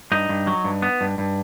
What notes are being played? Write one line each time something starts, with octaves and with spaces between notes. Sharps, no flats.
G2 D#4
G2
F#3
G2
B3
G2
G2